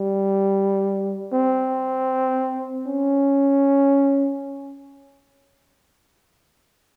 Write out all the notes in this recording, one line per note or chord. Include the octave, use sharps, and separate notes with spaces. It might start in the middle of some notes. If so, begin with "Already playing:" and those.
Already playing: G3
C4
C#4